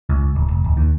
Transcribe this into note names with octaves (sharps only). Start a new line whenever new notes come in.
C#2
D1
F1
D1
D#2